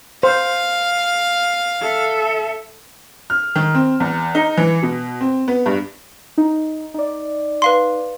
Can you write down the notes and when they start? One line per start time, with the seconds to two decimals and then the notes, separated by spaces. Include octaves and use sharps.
0.23 C5 F5
1.80 A4 E5
3.30 F6
3.56 D#3
3.74 C4
4.00 E2
4.35 D#4
4.57 E3
4.82 B2
5.21 C4
5.48 B3
5.66 G2
6.38 D#4
6.94 D#4 D5
7.62 B4 F5 C6